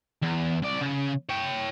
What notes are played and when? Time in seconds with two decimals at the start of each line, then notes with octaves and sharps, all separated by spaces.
0.22 E2
0.62 C2 D5
0.81 C#3
1.29 C#5 G5